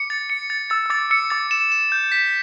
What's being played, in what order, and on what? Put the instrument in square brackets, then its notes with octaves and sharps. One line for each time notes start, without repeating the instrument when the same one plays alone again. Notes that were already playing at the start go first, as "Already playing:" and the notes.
Already playing: [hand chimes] D6 [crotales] C#7
[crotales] A6
C#7
A6
[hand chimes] E6 [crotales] A6
[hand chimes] E6
[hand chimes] D6 [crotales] A6
[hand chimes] E6 [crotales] C#7
[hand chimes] D6 [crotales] A6
[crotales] E7
E7
G6
B6